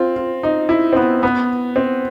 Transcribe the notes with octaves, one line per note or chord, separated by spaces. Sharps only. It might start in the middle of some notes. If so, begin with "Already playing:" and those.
Already playing: C4 F4
F4
D#4
E4
C4
B3
B3
C4